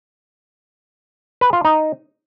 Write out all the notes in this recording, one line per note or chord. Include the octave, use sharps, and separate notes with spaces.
B4
F4
D#4